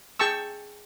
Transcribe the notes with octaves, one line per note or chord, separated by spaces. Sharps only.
G#4 G5 A5 C#6 E6